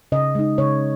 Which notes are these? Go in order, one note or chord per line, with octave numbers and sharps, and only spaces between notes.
C#3 D#5
G#3 D#4
C#3 C#5